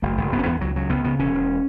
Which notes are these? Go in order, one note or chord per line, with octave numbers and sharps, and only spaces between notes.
F#1 A3
F#1
F#1 B3
C#4
E2 B3
C#2 F#3
C#3 F#3
C#2 B3
C#3 B3
E1 C#4
E1